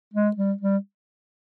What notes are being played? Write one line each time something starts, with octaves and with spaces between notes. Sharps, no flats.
G#3
G3
G3